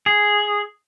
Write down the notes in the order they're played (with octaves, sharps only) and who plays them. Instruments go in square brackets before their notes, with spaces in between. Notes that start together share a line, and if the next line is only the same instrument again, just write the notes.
[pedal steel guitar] G#4